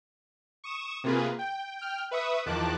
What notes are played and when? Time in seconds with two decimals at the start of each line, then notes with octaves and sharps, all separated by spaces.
0.64 C#6 D#6 E7
1.04 C3 A#3 F4 G#4 B4
1.39 G5
1.78 G5 F6
2.11 B4 E5 C#6 D#6
2.46 E2 D#3 F3 A5 D6 F#6